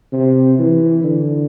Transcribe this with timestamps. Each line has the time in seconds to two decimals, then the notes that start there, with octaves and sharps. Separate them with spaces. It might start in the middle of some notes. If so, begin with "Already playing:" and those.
0.13 C3
0.59 E3
1.04 D3